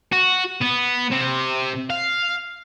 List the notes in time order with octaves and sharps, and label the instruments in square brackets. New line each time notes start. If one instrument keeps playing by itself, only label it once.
[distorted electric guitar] F#4
B3
C3
F5